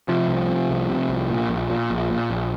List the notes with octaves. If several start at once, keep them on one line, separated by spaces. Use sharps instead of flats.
C3 F3
C2
C3
C2
C3
C2
A#2
A#1
A#2
A#1
A#2
A#1